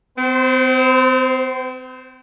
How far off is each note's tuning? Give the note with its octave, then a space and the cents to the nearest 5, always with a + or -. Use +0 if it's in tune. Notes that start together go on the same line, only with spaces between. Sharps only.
C4 -40 C5 +0